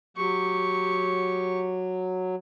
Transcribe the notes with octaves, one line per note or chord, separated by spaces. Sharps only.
F#3 G4 C#6